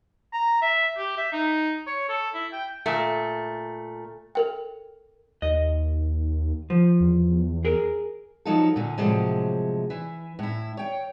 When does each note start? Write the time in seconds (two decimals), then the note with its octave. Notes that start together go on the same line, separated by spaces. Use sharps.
0.33 A#5
0.62 E5
0.97 G4
1.17 E5
1.32 D#4
1.86 C#5
2.09 A4
2.34 E4
2.53 G5
2.86 A#2 A3
4.35 A4 A#4 G5
5.42 D#2 D#5
6.70 F3
7.00 E2
7.65 G#4 A#4
8.45 F3 F#3 D#4 F4 A4
8.76 A#2 D3
8.98 A2 C3 F3 F#3 G#3
9.90 E3
10.39 A2 E4
10.77 C#5 G5